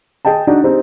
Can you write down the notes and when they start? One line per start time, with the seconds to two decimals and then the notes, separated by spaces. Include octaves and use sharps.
0.25 G#4 D#5 G5 A5
0.47 D4 D#4 F#4
0.64 C4 D#4 G4 G#4